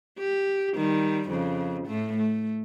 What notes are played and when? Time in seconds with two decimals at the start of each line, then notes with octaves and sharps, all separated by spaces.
0.19 G4
0.76 D#3 G3
1.30 F2 C#3
1.86 A2 A3
2.17 A3